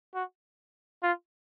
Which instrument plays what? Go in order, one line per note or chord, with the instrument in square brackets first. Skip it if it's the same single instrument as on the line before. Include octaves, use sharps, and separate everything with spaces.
[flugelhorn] F#4
F4